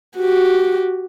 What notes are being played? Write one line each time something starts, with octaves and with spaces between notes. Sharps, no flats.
F#4 G4